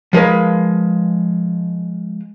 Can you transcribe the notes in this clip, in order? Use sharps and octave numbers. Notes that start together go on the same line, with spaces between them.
F3 G#3 A#4 B4